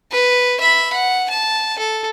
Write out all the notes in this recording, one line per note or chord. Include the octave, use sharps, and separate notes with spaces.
B4
E5 B5
F#5
A5
A4